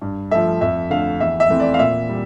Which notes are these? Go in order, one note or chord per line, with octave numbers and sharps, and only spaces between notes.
G2
F3 A3 E5
F2 E5
D3 A3 F5
E2 E5
E5
E3 A3 C4
D5
F5
A#2 E5
G3